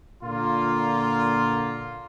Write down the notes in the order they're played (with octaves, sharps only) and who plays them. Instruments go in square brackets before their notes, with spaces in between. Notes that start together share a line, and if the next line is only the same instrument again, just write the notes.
[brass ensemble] A#2 D3 A#3 F4